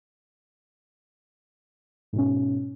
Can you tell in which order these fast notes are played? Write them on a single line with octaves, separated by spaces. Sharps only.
G#2 B2 C#4